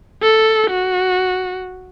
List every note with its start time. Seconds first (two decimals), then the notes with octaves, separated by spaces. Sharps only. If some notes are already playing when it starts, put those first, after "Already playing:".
0.22 A4
0.70 F#4